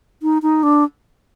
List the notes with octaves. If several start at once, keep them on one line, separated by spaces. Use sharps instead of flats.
D#4
D#4
D4